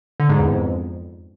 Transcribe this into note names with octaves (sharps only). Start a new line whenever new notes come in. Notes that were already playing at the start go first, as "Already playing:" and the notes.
D3
G#2
E2
F2